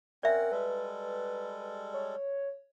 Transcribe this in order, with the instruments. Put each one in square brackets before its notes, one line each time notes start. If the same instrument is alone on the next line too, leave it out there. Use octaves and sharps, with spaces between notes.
[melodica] C4 C#4 F#5 [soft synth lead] A#4 [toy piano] D5 E5
[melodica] G3 G#3 A4 [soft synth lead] B4
[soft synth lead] C#5